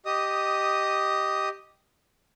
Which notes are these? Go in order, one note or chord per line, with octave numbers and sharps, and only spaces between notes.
G4 D#5 D#6